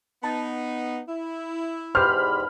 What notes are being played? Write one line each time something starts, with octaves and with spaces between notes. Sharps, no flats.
B3 D#4 A5
E4
E2 G#2 G4 C5 B5 F6